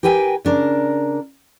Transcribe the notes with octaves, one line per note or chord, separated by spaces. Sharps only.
G4 A#4 B4 G5 G#5
C#3 D4 A#4